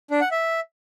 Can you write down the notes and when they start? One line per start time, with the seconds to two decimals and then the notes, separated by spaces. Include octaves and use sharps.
0.11 D4
0.21 F#5
0.31 E5